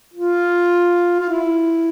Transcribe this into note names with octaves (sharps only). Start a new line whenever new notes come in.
F4
F4
E4